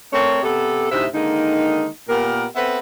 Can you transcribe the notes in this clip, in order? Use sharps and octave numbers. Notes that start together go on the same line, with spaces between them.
A3 C4 A#4 C#5
C3 B3 G4 A4
D2 A2 C3 D#4 E5
D3 D#3 G#3 A#3 D#4
A#2 B3 G4 A#4
B3 C4 A4 B4 C5 E5